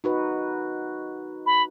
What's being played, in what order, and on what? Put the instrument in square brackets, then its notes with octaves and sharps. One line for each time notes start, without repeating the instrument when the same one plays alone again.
[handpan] D#4 F#4 B4
[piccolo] B5